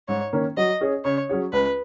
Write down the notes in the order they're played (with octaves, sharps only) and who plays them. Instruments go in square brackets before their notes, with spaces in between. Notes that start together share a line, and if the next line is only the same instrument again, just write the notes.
[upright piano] G#2 [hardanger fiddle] C#5
[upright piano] D#3 A#3 C#4
[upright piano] F#3 [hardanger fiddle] D#5
[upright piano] C#4 G#4 C#5
[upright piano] C#3 [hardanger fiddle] C#5
[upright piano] F#3 C#4 G#4 C#5
[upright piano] C#2 [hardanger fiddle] B4